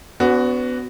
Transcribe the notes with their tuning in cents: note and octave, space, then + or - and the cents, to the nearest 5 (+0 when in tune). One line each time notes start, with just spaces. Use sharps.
B3 +25 D4 -40 F#4 +0